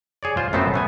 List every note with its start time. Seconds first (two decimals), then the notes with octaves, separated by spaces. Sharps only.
0.23 G#4 C#5 D5
0.37 F4 C5
0.53 F#2 A3 B3 C4 C5 A5
0.74 A3 B3 G#5